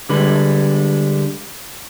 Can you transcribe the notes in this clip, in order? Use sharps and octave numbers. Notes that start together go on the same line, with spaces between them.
D3 G3 G#3 B4